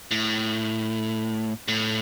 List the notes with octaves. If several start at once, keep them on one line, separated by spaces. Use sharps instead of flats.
A2
A2